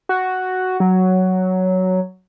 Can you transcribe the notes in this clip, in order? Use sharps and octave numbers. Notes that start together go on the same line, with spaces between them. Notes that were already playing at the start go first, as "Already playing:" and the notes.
F#4
F#3